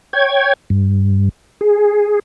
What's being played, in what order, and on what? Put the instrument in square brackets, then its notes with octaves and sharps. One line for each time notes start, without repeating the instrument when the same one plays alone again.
[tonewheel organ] C#5 G5 G#6
G2
G#4